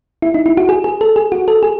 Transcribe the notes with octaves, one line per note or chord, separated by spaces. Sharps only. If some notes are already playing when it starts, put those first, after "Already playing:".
E4
D#4
E4
F#4
G#4
G#4
A4
G#4
F#4
A4
G#4